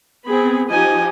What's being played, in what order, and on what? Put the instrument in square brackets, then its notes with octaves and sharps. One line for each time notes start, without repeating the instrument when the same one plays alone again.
[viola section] B3 C4 G#4 [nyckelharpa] B5
[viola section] F3 D#4 G4 [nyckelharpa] D#5 G#5